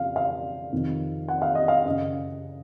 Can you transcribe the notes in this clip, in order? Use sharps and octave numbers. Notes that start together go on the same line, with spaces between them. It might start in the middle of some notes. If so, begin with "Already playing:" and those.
Already playing: F2 C#3 F5
F5
F2 C3 D#3
F#5
F5
D#5
F5
F#2 C#3 D#5